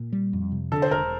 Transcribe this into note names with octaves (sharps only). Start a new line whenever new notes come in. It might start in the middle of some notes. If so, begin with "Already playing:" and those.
Already playing: A#2
G3
F2
C3
D3 A4
C5
E1 A#4